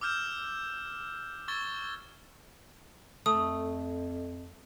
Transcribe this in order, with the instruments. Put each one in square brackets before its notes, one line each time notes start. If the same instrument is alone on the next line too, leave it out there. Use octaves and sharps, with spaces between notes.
[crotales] D6 E6 F6 G6 E7
C#6 E6 G#6 A6 G7
[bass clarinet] F2 [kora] A3 [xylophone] D#6